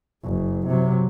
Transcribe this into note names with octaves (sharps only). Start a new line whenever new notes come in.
F#1
C3 F#3